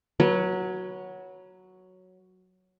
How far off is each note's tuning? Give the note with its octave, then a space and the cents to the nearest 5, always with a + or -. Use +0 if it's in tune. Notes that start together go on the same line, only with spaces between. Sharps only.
F#3 +0 B4 -30